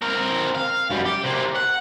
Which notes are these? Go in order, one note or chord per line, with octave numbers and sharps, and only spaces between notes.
C4 A#4
F5
F#2 G3
G4
C3 A#3
F#5